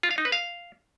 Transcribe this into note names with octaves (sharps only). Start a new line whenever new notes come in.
F4
F5
D#4
B4
F5